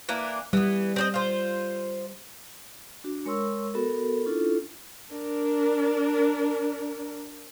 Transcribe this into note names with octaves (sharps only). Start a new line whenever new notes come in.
E3 A#3 D4
E3 G3 B3
C4 D4 D#5
F4 C5
D4 F#4
G#3 A#4 C#5 C6 C#6 E6
B3 F#4 A4 A#4
C#4 D4 E4 F4 A4
D4 A#4